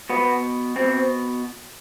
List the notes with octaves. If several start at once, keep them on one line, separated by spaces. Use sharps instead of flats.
B2 B3
B2 C4